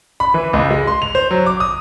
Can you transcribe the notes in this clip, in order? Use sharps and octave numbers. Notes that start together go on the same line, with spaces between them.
B5
E3
C#2
G#3
C6
F7
C5
F#3
D6
D#6